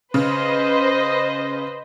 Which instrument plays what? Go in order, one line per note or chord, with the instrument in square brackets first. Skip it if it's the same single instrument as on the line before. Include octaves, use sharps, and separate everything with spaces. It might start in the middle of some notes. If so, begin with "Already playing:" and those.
[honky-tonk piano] C#3 [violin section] B4 C5 D#5